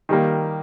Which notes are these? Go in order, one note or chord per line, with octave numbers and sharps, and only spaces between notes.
D#3 G3 A#3